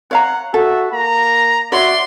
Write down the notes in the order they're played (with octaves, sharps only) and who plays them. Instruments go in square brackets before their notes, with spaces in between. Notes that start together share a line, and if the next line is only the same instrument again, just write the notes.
[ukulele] C#5 F5 A#5 [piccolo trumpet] F#5
[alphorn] F#4 [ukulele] A4 [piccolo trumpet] E5
[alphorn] A#3 [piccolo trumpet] A#5
[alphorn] F#4 [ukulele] C#5 E5 [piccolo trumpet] D5 [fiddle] C6